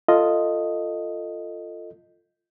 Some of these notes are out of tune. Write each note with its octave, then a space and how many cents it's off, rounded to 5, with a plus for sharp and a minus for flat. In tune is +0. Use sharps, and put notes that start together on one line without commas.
F4 -5 A4 +20 D#5 +0